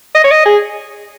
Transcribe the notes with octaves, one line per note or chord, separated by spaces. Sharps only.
D#5
C#5
D#5
G#4